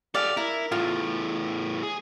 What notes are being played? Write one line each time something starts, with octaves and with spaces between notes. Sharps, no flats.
G4 A4 D5 F5
E4 A#4
E2 A2 F4
G#4